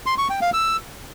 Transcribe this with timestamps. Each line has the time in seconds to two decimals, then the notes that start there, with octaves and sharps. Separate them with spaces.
0.06 C6
0.18 C#6
0.30 G5
0.42 F5
0.53 E6